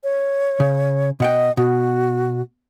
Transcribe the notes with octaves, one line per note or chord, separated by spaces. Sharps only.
C#5
C#3
B2 D#5 F#5 G5
B2 F#4